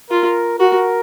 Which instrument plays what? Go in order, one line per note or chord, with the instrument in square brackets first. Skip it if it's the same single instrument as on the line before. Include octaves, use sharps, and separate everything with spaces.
[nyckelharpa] F4 [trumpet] A#4
[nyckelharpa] F#4 [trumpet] A#4